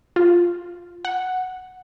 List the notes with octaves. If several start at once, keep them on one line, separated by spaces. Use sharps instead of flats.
F4
F#5